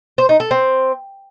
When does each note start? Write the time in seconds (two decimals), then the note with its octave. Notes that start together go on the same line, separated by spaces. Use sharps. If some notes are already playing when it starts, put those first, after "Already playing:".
0.18 C5
0.29 D#4
0.40 A4
0.51 C4